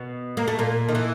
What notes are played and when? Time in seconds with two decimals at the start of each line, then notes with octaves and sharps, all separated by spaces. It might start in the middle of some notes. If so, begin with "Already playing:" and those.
Already playing: B2 B3
0.37 A#3
0.48 A3
0.59 A#2 A#3
0.89 D#3
0.95 E3